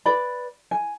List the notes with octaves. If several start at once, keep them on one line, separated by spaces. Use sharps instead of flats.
B4 D5 B5
G#5